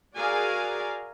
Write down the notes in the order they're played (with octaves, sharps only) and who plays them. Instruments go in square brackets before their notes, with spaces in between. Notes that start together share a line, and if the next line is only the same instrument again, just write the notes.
[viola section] F#4 G#4 A#4 D5 F5 G#5